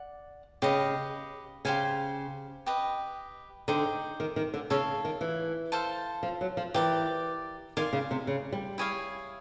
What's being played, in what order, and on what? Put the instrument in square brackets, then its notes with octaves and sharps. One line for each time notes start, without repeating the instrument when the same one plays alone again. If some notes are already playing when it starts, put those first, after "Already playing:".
Already playing: [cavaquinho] D5 F#5
[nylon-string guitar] C#3 [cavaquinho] G4 B4 D#5
[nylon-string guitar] C#3 [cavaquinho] G4 C5 F5 G#5
[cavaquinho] G4 B4 D#5
[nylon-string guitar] D3 [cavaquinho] D#4 G4 C5
[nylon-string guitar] D#3
D#3
D3
[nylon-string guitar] C#3 [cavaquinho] A4 C#5 F5
[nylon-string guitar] D#3
E3
[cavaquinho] A4 C5 F5 A5
[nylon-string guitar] F3
F#3
F3
[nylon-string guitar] E3 [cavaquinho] G4 A#4 D5
[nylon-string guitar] D#3 [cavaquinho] D5 F5 G#5 C6
[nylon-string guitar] C#3
C3
C#3
G3
[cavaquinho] E4 G#4 C#5 F5